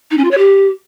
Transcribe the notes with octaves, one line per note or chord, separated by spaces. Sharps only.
D#4
C#4
F4
C#5
G4